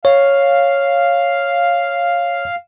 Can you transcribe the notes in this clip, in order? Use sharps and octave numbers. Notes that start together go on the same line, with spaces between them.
C#5 F5